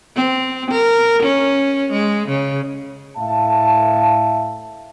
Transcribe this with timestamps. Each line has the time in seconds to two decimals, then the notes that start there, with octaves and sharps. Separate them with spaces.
0.16 C4
0.71 A#4
1.23 C#4
1.91 G#3
2.29 C#3
3.17 A2 E5 F5 A5